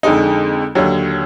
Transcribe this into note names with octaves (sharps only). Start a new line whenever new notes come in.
F2 D3 G#3 D#4
D#2 D3 F#3